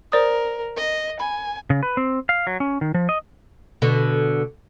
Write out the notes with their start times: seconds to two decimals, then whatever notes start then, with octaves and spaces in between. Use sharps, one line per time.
0.12 A#4 C5 D5 D#6
0.77 D#5
1.20 G#5 B5
1.70 C#3
1.83 B4
1.97 C4
2.29 F5
2.47 F#3
2.60 C#4
2.81 D#3
2.94 F3
3.09 D#5
3.82 B2 D3